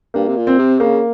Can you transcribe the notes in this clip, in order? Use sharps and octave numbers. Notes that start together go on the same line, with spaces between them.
G2 A#3
C3
A#2
C4
C3
C#3 A#3